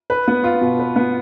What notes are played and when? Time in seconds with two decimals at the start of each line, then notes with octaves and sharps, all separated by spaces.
0.10 B4
0.28 B3
0.44 F4
0.61 B2
0.79 B4
0.96 B3